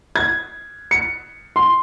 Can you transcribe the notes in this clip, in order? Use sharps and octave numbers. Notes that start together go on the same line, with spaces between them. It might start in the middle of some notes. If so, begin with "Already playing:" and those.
G#6
C#7
C6